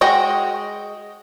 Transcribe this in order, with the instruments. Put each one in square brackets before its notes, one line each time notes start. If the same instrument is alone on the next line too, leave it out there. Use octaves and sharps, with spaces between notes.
[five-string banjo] G#3 F#4 D#5 G5